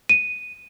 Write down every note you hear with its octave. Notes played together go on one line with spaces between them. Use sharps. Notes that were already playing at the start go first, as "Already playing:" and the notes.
D#7